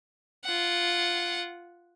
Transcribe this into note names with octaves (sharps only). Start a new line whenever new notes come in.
F4 F#5